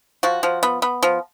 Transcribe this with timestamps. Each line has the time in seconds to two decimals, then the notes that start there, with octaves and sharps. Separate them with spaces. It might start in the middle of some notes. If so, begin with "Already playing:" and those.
0.23 F3 F#4
0.43 F3
0.63 B3
0.82 B3
1.03 F3